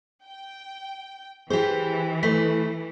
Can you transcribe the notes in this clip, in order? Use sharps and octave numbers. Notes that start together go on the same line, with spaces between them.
G5
E3 G4 G#4 C5
A3 B4 C5 B6